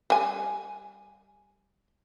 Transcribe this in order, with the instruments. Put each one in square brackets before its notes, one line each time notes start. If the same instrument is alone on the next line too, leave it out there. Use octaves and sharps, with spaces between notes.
[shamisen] G3 G#5